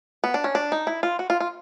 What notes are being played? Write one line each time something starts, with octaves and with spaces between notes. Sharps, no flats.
B3
D4
C#4
D4
D#4
E4
F4
F#4
F4
F4